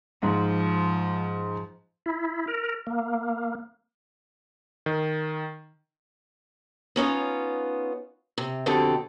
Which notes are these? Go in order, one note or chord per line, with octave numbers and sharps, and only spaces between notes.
G#2 F3
E4
A#4
A#3
D#3
B3 C#4 D#4 F4
C3
F2 B2 D3 C4 G4 A4